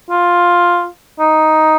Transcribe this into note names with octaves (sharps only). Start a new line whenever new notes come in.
F4
D#4